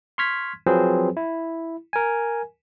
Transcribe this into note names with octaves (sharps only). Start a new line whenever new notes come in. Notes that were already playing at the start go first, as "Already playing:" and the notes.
C6 C#6 F6 G#6 B6
F3 F#3 C4 G#4 B4 C5
E4
A#4 G#5